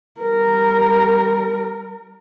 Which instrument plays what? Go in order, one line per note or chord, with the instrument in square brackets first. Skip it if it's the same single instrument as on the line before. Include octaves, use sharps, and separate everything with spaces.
[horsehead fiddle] G3 A#4